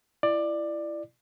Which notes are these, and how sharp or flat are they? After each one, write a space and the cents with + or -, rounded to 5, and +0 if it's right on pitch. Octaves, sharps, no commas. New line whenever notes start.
E4 +25 D5 +15